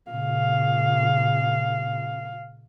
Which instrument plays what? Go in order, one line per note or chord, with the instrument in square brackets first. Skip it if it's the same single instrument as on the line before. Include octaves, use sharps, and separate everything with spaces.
[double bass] A#2 C#3 [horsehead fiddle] F5